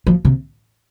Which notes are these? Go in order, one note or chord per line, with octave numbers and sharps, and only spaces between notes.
F3
C3